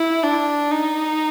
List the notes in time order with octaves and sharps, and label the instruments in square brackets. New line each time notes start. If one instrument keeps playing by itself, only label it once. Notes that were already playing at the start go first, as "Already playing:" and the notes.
Already playing: [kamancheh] E4
D4
D#4